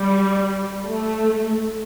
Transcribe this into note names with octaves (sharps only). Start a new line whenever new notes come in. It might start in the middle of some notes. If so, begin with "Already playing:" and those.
Already playing: G3
A3